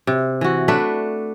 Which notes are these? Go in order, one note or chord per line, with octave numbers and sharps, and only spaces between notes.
C3
E3 F#4
A3 D4 B4